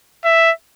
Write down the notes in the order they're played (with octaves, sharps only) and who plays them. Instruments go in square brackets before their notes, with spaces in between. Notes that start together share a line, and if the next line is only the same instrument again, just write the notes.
[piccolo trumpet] E5